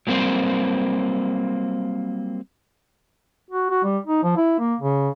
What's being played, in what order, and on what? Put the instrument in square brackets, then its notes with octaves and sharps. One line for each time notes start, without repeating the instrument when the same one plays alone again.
[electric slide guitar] F#3 G3 A#3 C4 C5
[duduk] F#4
F#4
G3
D#4
F3
E4
A#3
C#3